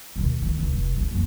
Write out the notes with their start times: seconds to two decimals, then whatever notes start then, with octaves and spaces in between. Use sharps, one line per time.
0.16 D#2 B2
0.42 D2 D#3
0.57 F1 D2
0.73 F1
0.93 G#2 E4
1.11 F2 A#3